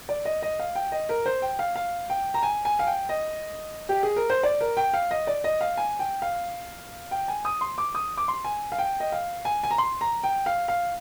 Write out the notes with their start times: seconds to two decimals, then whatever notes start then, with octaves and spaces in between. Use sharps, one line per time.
0.09 D5
0.25 D#5
0.42 D#5
0.59 F5
0.75 G5
0.92 D#5
1.09 A#4
1.26 C5
1.42 G5
1.59 F5
1.76 F5
2.10 G5
2.34 A#5
2.43 G#5
2.65 G#5
2.79 F5
2.87 G5
3.09 D#5
3.89 G4
4.03 G#4
4.16 A#4
4.30 C5
4.43 D5
4.61 A#4
4.77 G5
4.94 F5
5.11 D#5
5.27 D5
5.44 D#5
5.61 F5
5.77 G#5
5.99 G5
6.22 F5
7.11 G5
7.28 G#5
7.45 D#6
7.61 C6
7.78 D6
7.95 D#6
8.17 D6
8.28 C6
8.44 G#5
8.72 F5
8.79 G5
9.00 D#5
9.12 F5
9.45 G#5
9.63 G#5
9.71 A#5
9.78 C6
10.01 A#5
10.23 G5
10.46 F5
10.68 F5